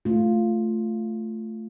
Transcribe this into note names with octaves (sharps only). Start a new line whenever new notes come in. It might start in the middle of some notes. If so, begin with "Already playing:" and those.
A3 F4